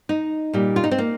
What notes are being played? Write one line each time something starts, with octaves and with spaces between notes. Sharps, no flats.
D#4
A#2 G3
F4
D#4
C4
A#3